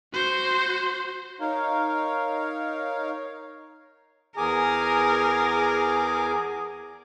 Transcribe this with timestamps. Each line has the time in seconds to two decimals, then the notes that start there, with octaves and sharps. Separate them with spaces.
0.13 F#4 C5
1.40 D#4 A#4 C#5 F5
4.37 E2 G#4 A#4 G#5 D6